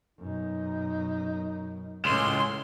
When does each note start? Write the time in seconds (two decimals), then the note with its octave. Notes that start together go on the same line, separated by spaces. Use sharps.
0.19 F#2 B2 D#4
2.05 C#2 A2 C#4 C6